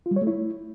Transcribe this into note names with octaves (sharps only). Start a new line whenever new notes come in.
F4
G3
C#5
A3
E4